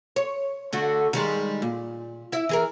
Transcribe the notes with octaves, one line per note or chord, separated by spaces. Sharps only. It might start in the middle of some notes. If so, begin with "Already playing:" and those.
C#5
D3 A3 F#4
D#3 G3 G#3
A#2
E4 E5
E3 G#4 A#4